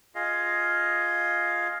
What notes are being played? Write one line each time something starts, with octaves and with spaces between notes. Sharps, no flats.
F4 G#4 D#5 F5